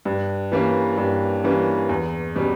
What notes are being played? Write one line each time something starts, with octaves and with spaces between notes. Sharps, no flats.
G2
E3 G3 A#3 C#4
G2
E3 G3 A#3 C#4
E2
B2 G3 C#4